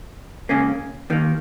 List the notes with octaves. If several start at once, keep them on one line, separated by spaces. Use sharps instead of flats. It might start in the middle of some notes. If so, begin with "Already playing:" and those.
C#2 C#3 A#3 C#4
D#2 D#3 A#3